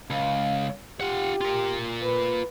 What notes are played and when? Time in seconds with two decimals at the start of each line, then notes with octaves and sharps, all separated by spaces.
0.10 C#2 F5
1.01 F4 G4 F#5
1.41 F4 A#4
2.03 B4